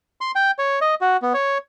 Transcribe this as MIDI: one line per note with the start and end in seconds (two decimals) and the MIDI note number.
0.21 0.31 84
0.35 0.51 79
0.59 0.79 73
0.81 0.95 75
1.01 1.17 66
1.22 1.33 59
1.34 1.58 73